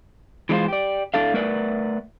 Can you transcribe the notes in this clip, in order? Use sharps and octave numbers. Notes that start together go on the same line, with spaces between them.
E3 G#3 D4 F4 C5
G4 D5
A2 A3 C#4 D4 A4 F5
A3 A#4 B4 D5 F#5